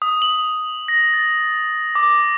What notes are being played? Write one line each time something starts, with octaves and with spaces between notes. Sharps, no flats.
D#6
F#7
A#6
A6
D6